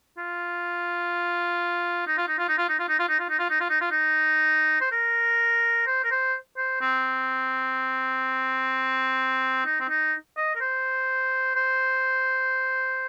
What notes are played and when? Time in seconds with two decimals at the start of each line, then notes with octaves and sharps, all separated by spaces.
0.18 F4
2.07 D#4
2.18 F4
2.28 D#4
2.38 F4
2.48 D#4
2.58 F4
2.69 D#4
2.79 F4
2.89 D#4
2.99 F4
3.08 D#4
3.20 F4
3.30 D#4
3.39 F4
3.50 D#4
3.60 F4
3.70 D#4
3.81 F4
3.91 D#4
4.81 C5
4.92 A#4
5.87 C5
6.04 A#4
6.11 C5
6.57 C5
6.81 C4
9.66 D#4
9.80 C4
9.89 D#4
10.37 D#5
10.55 A#4
10.60 C5
11.56 C5